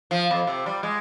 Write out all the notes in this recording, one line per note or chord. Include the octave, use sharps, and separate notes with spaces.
F3
F2
C3
G3
G#3